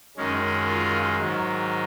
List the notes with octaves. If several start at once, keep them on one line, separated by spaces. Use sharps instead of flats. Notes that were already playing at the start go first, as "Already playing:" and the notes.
F#2 D#3 G#3 C#4
F4
G#2 D#3 F#3